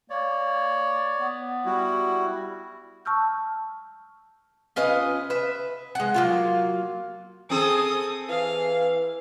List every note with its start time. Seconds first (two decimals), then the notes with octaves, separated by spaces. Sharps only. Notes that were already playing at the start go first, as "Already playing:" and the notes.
0.10 A#3 C#5 D5
1.20 B3
1.65 G3 E4 F#4
3.05 A5 C#6 E6 F6 G6
4.76 C#4 F4 B4 D#5
5.30 B4 E5
5.95 G#3 F#5
6.14 F#3 A#3 F4
7.50 C4 G#4 A4 D#6
8.29 E3 F5